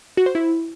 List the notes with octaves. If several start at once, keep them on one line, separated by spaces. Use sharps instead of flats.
F#4
C5
E4